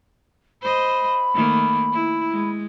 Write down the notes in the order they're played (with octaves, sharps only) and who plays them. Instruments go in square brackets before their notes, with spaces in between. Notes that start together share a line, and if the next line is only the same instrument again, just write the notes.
[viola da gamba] C5 D#5 [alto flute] B5
[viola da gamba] D#3 A3 A#3
E4
G#3